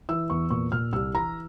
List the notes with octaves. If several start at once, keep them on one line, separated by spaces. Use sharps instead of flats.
E3 E6
E2 C#6
A#2 C#6
A#2 F6
C2 E6
E3 A#5